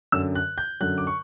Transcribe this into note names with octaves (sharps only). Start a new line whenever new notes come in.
F#2 D3 F#3 E6
F#6
G6
F#2 D3 F#3 F#6
D6
C#6